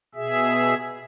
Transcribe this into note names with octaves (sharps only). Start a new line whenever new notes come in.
B2 G#4 E5